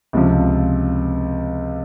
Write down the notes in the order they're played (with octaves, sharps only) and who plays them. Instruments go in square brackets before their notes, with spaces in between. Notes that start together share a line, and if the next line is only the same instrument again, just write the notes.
[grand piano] C#2 C3 F3